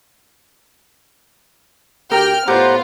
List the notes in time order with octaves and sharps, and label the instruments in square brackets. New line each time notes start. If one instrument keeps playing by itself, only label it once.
[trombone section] D2 G4 [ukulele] A#4 [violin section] G5 F6
[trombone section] A2 C5 [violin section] B3 F4 [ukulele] G4 D5 [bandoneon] F#5 A#5